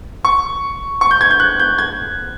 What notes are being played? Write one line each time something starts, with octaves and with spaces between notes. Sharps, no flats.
C#6
C#6
G6
G#6
G6
F#6
G6
G#6